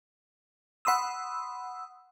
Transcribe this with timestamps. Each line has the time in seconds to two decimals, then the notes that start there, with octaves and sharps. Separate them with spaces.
0.85 F#5 B5 C6 D#6 E6